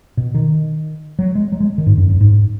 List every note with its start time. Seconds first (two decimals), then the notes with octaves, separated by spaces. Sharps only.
0.17 B2
0.35 D#3
1.19 F#3
1.35 G#3
1.52 F#3
1.60 G#3
1.78 D#3
1.86 G#2
1.98 F#2
2.09 F#2
2.21 G#2